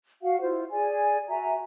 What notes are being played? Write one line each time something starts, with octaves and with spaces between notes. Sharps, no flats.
F#4 F5 F#5
E4 F4 C5
G#4 D5 G#5
F#4 E5 G#5 A#5